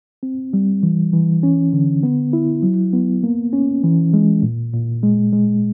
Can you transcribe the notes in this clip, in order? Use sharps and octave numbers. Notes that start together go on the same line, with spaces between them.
C4
G3
E3
E3
C#4
D3
B3
E4
F#3
B3
A#3
C#4
E3
G#3
A#2
A#2
G#3
G#3